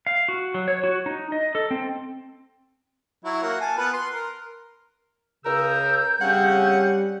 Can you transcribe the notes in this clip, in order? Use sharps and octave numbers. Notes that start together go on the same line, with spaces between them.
F5
F#4
F#3
C#5
F#4
D#4
D#5
A4
C4
F#3 E4
A#3 F#4
G#5 A5
B3 F4 B4
C6
A#4
C#2 C#3 A#4 E6 G6
C#3 G3 C4 C#4 F#5